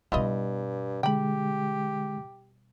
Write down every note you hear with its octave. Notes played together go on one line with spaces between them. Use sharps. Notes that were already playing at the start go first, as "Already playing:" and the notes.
G2 B2 G3 E4 F4 D#5
D3 G#3 G4 G5 B5